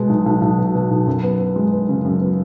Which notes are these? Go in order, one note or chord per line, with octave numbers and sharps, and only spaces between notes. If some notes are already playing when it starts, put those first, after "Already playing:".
Already playing: B2 G#3
B1
B1
B1
B2
B2
B1
F#2
B3
B3
G#3
B3
C#3
F#2
B3